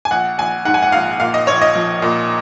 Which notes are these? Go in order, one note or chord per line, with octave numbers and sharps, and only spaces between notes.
G#5
A#1 F#5
A#1 G#5
G#2 F#5
G#5
F#5
A#1 F5
A#2 F5
D#5
A#1 C#5
D#5
F3
A#2